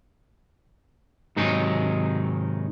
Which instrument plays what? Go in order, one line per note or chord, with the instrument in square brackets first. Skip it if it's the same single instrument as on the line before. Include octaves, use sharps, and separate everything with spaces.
[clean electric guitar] G#2 C3 D#3 F#3 D#4 G#4